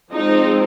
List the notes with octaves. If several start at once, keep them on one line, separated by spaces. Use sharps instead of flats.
F3 G#3 C4 D#4